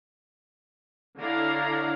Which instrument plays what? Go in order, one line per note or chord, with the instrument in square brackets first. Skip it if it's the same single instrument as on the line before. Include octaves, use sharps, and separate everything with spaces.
[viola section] D3 D4 E4 C#5 F5 A#5